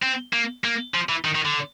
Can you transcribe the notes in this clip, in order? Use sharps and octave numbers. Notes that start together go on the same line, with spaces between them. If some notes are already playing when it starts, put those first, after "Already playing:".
C4
A#3
A#3
F3
E3
D#3
D#3
D3